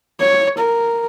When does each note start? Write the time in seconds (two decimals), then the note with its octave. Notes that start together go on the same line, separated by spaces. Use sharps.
0.20 C#5
0.58 A#4